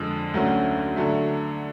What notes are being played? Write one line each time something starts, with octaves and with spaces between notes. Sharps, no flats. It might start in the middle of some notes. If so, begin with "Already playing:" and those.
Already playing: F2 D3 G#3
D2 D3 F#3 C#4 F#4
D3 F#3 A3